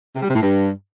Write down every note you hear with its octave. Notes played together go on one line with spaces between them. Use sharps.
C3
G3
C3
A2
G2